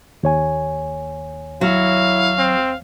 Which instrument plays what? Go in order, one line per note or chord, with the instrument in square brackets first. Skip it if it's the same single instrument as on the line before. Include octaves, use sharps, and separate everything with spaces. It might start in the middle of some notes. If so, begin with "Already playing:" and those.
[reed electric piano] D#2 C#5 G#5
[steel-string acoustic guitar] F#3 [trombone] E4 [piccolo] F5
[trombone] C4